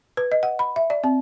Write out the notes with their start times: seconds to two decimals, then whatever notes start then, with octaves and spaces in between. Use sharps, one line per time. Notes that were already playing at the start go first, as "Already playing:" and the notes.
0.17 B4
0.32 D#5
0.43 F#5
0.59 B5
0.76 E5
0.90 D5
1.04 C4